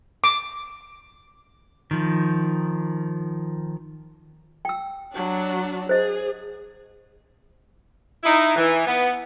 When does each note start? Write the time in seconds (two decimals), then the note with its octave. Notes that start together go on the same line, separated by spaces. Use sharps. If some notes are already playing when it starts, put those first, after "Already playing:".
0.24 D6
1.91 D#3 F3
4.65 G5 E6
5.13 F#3 D4
5.89 G#4 C5 D#5
8.24 D#4 E4
8.56 E3
8.87 B3